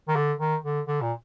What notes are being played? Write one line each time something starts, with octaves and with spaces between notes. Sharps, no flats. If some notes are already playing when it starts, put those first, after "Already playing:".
D#3
D3
D#3
D3
D3
A#2